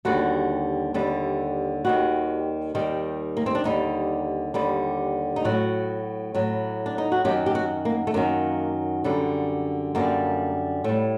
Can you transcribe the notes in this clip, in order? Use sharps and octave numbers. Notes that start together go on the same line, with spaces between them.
D#2 D3 G3 F#4
D#2 D3 G3
D#2 D#3 G3 F#4
D#2 D#3 G3
A#3
C4
D4
D#2 D3 G3 D#4
D#2 D3 G3
D#4
A2 F#3 F#4
A2 F#3
D4
D#4
F#4
F#2 D#3 F#3 G4
G4
F#4
A#3
A3
F#2 D#3 F#3 A#3
F#2 D3 G3
F#2 D3 G3 A#3
A2 G3